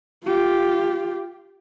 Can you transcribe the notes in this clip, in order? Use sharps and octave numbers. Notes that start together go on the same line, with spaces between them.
F4 G4